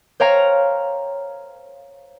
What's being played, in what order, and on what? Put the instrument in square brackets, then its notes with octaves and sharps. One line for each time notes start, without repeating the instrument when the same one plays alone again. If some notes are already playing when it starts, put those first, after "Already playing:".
[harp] C5 C#5 F5 G5 A#5